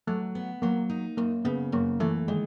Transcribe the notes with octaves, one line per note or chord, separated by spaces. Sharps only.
F#3 A3
B3
F#3 A#3
D#4
F#2 A#3
C#3 B3
F#2 A#3
E3 A3
D#3 G#3